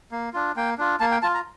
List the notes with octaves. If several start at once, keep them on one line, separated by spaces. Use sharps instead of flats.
A#3
D4 F4
A#3 G5
D4 F4
A#3 A5
G5
F4 A5
A#5